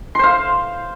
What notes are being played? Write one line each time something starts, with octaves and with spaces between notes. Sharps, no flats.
C5 F5 C6